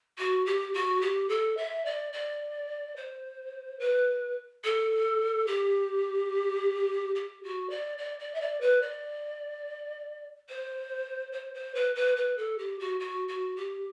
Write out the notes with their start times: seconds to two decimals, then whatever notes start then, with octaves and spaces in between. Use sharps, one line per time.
0.18 F#4
0.46 G4
0.74 F#4
1.01 G4
1.29 A4
1.57 E5
1.85 D5
2.13 D5
2.96 C5
3.79 B4
4.64 A4
5.47 G4
7.15 G4
7.43 F#4
7.70 D5
7.98 D5
8.19 D5
8.34 E5
8.41 D5
8.61 B4
8.82 D5
10.49 C5
11.32 C5
11.54 C5
11.75 B4
11.95 B4
12.16 B4
12.37 A4
12.58 G4
12.79 F#4
13.00 F#4
13.28 F#4
13.56 G4